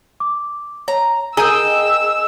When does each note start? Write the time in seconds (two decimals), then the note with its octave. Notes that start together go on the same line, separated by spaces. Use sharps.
0.20 D6
0.88 C#5 A#5
1.37 G#4 A#4 D#5 G5 A#5 E6